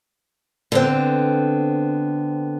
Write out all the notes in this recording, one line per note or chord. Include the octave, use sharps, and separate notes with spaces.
D3 B3 C4